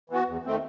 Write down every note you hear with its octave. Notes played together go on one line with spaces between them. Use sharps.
E3 B3 F#4
E2
D#3 A3 C4